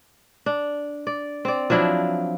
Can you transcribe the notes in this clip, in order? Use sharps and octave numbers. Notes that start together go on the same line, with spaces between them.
D4
D5
C4 D5
F3 F#3 D4 E4